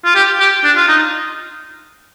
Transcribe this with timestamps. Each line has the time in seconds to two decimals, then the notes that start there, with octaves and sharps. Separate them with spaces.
0.05 F4
0.15 G4
0.40 G4
0.64 D4
0.76 F4
0.88 D#4